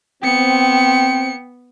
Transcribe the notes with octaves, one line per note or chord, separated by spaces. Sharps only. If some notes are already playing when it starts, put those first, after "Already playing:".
B3 C4 G5 C#7